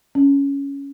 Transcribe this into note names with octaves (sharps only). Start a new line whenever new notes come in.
C#4